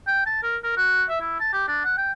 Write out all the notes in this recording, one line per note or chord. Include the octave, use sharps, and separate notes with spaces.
G5
A5
A#4
A#4
F#4
E5
E4
A5
G4
D4
F#5
G5